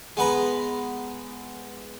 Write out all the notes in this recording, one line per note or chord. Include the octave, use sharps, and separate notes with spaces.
G#3 B3 B4 A#5